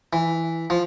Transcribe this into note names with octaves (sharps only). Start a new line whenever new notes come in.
E3
F3